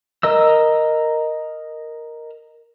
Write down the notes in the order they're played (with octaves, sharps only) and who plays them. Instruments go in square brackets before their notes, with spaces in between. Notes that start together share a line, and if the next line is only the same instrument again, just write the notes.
[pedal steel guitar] A#4 D#5 E6